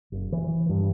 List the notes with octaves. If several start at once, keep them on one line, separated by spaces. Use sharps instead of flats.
F#1
E3
G2